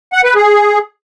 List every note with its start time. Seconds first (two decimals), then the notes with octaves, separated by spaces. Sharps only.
0.13 F#5
0.24 B4
0.35 G#4